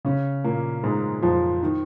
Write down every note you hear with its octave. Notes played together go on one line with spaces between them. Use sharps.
C#3 C#4
A#2 A#3
G#2 G#3
F2 F3
D#3